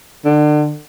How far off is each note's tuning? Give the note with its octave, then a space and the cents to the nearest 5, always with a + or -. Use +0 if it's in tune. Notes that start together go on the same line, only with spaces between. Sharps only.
D3 +35